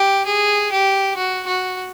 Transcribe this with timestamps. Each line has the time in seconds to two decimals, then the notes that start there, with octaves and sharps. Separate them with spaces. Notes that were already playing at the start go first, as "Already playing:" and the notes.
Already playing: G4
0.26 G#4
0.72 G4
1.17 F#4
1.47 F#4